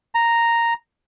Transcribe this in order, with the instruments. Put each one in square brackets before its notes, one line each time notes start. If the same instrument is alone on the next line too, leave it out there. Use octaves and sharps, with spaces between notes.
[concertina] A#5